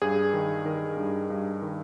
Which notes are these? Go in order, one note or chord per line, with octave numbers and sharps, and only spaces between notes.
G2 G#4
D#3
D#3 A#4
G2
G2
D#3